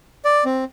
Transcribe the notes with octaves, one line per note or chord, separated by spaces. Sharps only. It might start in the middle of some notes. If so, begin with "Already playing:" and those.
D5
C4